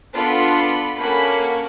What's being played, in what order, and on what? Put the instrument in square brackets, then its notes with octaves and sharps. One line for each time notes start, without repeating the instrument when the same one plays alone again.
[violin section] B3 D4 F4 A4 B5
A#3 C#4 F#4 A4 B5